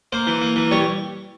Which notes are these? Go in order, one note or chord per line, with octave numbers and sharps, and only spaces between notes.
A#3 C5
E3
A#3
E3
G3 C#5